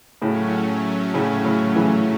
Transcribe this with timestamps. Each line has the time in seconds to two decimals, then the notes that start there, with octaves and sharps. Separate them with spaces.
0.21 A2 C#3 F#3 A3 C#4
1.14 A2 C#3
1.45 A2 C#3
1.76 C#3 E3